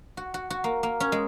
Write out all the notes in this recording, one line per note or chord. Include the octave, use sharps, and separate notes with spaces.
F#4
F#4
F#4
A#3
A#3
C#4
G#3